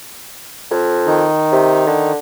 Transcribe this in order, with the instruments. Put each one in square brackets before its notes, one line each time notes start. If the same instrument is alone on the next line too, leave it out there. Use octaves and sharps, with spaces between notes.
[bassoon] F2
[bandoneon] D#3 D#4
[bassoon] C3
D3